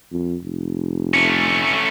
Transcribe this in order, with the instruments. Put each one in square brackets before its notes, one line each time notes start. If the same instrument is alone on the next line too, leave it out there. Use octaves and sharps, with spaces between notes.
[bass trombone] F2
F1
[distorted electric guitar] A3 C#4